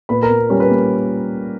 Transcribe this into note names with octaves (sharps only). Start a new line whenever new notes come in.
A#2 B4 B5
A#4 A#5
A#2
G3 C#4 C#5
B4
A#3